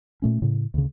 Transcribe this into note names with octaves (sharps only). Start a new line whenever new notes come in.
A#2 A3 C#4
A2 C#3
D2 C#3